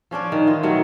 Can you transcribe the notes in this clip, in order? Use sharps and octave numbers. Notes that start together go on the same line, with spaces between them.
F3 C#4 D4 D5
D#3
E3 F4 D#5
B2 D#3 F#3 A3